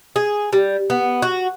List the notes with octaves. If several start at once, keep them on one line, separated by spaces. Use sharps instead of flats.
G#4
G3
B3
F#4